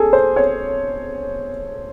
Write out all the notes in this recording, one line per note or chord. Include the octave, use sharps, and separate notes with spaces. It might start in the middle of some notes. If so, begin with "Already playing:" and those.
Already playing: G#4 A4
C5
C#5